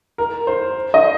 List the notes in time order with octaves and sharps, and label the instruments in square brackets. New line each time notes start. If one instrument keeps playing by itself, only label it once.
[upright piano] A#4
C5
D#5